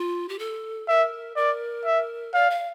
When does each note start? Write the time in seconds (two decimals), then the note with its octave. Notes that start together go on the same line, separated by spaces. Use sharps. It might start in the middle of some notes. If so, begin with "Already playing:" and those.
Already playing: F4
0.29 G4
0.39 A4
0.88 A#4 E5
1.36 A#4 D5
1.85 E5
2.34 D5 F5
2.50 F5